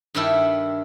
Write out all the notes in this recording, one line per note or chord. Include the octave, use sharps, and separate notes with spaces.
G2 D#3 D4 E4 A4